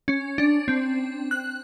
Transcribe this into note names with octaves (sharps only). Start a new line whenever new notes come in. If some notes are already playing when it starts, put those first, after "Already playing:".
C#4
D4
C4
F#6